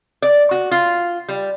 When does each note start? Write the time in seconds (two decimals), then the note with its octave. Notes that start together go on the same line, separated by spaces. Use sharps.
0.22 D5
0.51 F#4
0.71 F4
1.29 G3